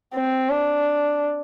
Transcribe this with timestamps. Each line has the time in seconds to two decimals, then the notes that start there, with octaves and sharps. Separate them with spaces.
0.15 C4
0.50 D4